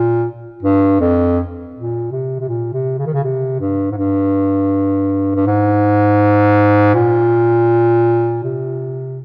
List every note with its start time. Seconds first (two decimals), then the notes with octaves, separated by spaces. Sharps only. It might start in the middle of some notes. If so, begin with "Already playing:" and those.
Already playing: A#2
0.63 G2
1.00 F2
1.75 A#2
2.11 C3
2.39 C3
2.48 A#2
2.73 C3
2.98 C#3
3.06 D#3
3.14 C#3
3.23 C3
3.60 G2
3.91 G#2
3.97 G2
5.35 G2
5.46 G#2
6.94 A#2
8.44 C3